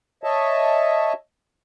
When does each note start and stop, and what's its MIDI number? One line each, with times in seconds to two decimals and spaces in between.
0.24 1.13 73
0.24 1.13 75
0.24 1.13 76
0.24 1.13 81